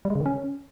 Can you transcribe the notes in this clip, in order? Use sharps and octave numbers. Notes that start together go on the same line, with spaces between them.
G3
G#3
C#3
D#3
C#4